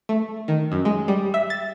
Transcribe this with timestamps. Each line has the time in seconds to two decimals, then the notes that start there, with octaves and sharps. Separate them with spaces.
0.09 A3
0.48 D#3
0.72 F#2
0.85 G#3
1.08 G3
1.34 E5
1.50 A6